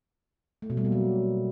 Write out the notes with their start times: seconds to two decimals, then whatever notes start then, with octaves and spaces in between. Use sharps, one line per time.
0.62 A3
0.70 B2
0.77 G3
0.85 A#3
0.92 F#3